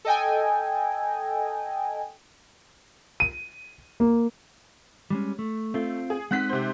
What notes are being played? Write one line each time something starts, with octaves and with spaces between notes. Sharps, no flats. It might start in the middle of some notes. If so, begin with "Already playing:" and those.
A4 D#5 G5 G#5
D#7
A#3
G3 G#3 C#4
A3
A3 C4 F4
G#4
G#3 C4 D#4 F#5 F#6 B6
C3 C5